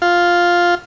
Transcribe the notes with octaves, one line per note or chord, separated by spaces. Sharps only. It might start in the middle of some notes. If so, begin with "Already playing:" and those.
F4